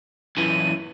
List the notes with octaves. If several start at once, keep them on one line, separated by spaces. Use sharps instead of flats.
F#2 E3 D#7